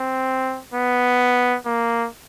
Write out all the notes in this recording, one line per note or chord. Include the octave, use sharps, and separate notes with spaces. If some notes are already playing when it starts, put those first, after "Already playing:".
Already playing: C4
B3
A#3